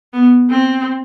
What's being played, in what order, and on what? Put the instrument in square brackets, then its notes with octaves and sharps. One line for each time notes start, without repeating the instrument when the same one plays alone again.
[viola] B3
C4